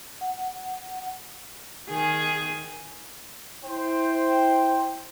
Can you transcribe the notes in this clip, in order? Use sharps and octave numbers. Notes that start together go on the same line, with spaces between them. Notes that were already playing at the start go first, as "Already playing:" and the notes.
F#5
D#3 G#4
E4 C5 G5